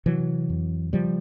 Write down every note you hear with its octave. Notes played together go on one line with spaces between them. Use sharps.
C3 E3 F#3
F2
C#3 F3 G3